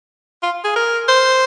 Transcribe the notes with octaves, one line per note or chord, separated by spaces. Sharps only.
F4
G#4
A#4
C5